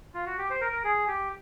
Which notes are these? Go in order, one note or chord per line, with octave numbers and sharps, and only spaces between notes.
F4
F#4
G4
C5
A#4
A#4
G#4
G4